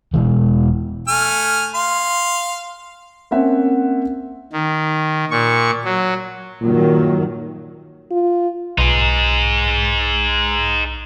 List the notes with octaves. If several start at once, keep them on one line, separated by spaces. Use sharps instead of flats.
E1 C#2 B2 E3
A3 G#5 F6
F5 C6
A#3 C4 C#4 E5 F#5
D#3
A#2 C#6
F#3
G2 A#2 D#3 F#3
F4
B1 D#4 G#4